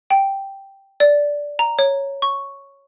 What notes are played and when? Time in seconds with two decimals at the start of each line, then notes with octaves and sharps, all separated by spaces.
0.10 G5
1.00 D5
1.59 A#5
1.79 C#5
2.22 C#6